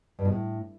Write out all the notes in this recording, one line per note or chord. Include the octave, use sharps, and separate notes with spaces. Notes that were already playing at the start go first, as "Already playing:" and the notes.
G2
B2
A2